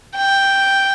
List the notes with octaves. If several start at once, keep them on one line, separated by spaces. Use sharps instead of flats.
G5